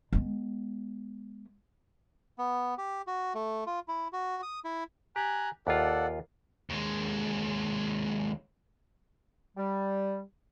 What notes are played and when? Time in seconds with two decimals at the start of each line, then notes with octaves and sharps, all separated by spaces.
0.13 G#3 B3
2.38 B3
2.78 G4
3.07 F#4
3.35 A3
3.67 F4
3.88 E4
4.13 F#4
4.43 D#6
4.65 E4
5.16 G4 G#5 A#5 F#6
5.67 D#2 F4 A4 D5 F#5
6.70 D#2 G#3
9.57 G3